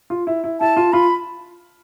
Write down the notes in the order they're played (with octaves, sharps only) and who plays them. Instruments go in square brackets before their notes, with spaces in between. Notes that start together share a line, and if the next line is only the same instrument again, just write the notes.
[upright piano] F4
E4
E4
[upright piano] E4 [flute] A5
[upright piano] F4
[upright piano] F4 [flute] B5